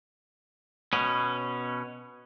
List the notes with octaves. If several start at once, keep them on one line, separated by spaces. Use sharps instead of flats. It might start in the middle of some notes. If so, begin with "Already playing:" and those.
B2 C#4